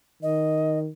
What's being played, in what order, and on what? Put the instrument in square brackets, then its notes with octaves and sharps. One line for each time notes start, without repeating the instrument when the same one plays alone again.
[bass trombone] D#3 [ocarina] D#5